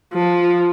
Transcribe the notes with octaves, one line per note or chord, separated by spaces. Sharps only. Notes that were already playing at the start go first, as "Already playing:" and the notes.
F3